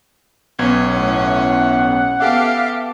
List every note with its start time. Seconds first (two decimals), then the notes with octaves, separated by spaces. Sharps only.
0.59 B1 B3 C#4 G#6
0.95 A2 F#5
2.20 B3 G4 A4 E5 F5 D6